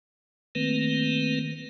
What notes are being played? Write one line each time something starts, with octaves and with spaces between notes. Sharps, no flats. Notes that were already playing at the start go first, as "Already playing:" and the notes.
D#3 A3 A#3 C4 B4